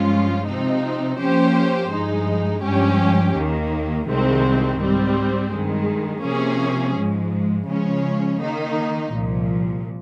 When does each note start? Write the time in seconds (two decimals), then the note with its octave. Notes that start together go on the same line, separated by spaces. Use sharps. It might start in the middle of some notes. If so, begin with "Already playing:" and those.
Already playing: G2 F3 G#3 C#4 F4
0.46 C3 F3 C4 D#4
1.18 F3 A#3 C#4 G4 C5
1.91 G2 F3 G#3 D#4
2.63 G2 F3 G#3 C#4 G4
3.36 D#2 D#3 A#3
4.07 C2 C3 D#3 G#3 C4
4.80 G#2 G3 C4
5.52 G2 D#3 G#3
6.24 C3 F3 A#3 C#4 G#4
6.96 G#2 F3 G#3
7.68 C#3 F3 G#3 C#4
8.40 D#3 A#3 D#4
9.12 C2 A#2 F3